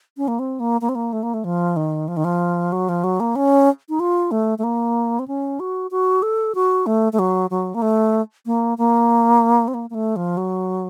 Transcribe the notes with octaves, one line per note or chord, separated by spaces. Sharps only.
C#4
A#3
C4
A#3
A#3
C4
A#3
A3
A#3
A3
F3
D#3
F3
D#3
F3
F#3
F3
F#3
A#3
C#4
D#4
F4
A3
A3
A#3
C4
C#4
F#4
F#4
A4
F#4
A3
A3
F#3
F#3
A#3
A3
A#3
A#3
C4
A#3
A#3
A3
F3
F#3